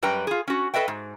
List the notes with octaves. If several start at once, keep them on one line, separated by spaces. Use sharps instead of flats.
F#2 G3 B4 G5 A#5
F4 G#4
C#4 F#4
A4 B4 D#5 E5 G5
G#2